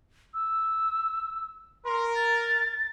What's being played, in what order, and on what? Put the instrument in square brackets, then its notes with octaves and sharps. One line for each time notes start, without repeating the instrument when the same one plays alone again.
[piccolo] E6
[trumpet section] A#4 [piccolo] C6
[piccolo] A6